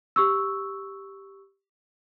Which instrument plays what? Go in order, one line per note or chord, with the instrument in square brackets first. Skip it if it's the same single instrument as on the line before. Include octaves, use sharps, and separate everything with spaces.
[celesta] G4 C#6 E6